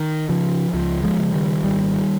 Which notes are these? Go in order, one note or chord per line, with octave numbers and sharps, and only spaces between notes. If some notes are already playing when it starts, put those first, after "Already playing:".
Already playing: D#3
C#3 F3
C#2 F3
F3 G#3
C#3
D#3 G3
G#1 D#3 G3